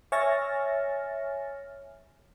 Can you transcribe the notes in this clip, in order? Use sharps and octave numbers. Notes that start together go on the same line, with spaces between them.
C#5 E5 G#5 F6 A6 A#6